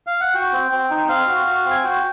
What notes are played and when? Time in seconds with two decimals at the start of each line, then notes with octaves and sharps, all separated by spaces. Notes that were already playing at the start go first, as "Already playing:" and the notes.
0.07 F5
0.21 F#5
0.34 F#4 G5
0.52 C4
0.71 C4
0.90 D#4
1.08 C4 F5
1.27 F#4
1.47 F#4
1.65 C4
1.71 G#5
1.84 F#4 G5